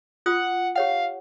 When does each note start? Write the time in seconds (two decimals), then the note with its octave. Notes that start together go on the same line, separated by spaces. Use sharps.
0.26 F4 F#5 D#6
0.75 G4 C#5 F5 F#5